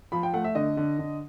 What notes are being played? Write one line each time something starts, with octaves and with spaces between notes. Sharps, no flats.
F3 B5
G5
A3 F#5
E5
D3 D#5
D3
D3